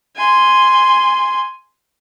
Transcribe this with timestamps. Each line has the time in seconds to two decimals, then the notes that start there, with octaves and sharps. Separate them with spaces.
0.16 G#5 C6